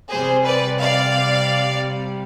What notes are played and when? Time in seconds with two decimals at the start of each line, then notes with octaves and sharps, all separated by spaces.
0.11 C3 G3 G#4 C5
0.46 B4 D5
0.80 D5 F5